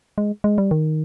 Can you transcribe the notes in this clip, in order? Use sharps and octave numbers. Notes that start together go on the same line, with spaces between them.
G#3
G#3
G3
D#3